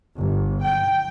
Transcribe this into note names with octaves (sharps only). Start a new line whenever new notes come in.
G1
G5